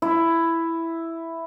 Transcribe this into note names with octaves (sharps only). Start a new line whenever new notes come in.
E4